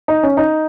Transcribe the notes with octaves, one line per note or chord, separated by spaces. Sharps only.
D#4
C#4
D#4